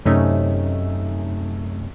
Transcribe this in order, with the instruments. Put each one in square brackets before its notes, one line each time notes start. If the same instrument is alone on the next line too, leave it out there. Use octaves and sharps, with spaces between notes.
[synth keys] F#2 C3 A3 C#4 D#4 E5